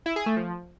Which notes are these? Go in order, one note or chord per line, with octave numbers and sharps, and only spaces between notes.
E4
G#4
A3
F3